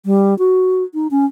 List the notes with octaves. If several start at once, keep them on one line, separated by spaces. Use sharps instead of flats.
G3
F#4
D#4
C#4